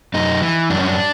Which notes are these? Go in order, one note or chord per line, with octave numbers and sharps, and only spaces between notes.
F#2 D#4
E3
F#2 D4
C#4
D4